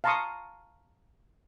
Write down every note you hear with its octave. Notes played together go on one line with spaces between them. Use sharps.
F5 A5 A#5 C6 C#6 D#6